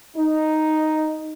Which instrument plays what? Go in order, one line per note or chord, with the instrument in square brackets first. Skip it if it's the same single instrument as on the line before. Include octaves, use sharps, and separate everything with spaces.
[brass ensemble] D#4